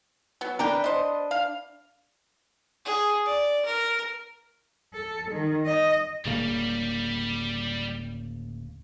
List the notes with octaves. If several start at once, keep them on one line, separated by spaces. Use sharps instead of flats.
F#3 B3
D4 A#4 B4 D5 G5
C5 D#5
F5
G#4
D5
A#4
A4
D#3
D#5
D1 C#3 G3 A#3